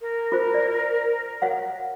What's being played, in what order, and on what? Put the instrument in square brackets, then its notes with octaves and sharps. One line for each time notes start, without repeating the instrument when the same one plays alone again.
[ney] A#4
[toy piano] F4 C5
D5
C#5 F5 F#5